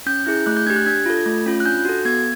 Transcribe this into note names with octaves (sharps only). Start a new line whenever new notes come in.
C#4 G6
E4 G#4 G6
A3 F#6
G6
D4 G4 G#6
F#6
D4 G#6
F4 A4
A3
C#4 F4
F#6
D4 G6
F#4 A4
B3 G#6